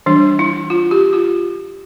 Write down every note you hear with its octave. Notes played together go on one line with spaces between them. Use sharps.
E3 G3 D4
E4
F4
G4
F4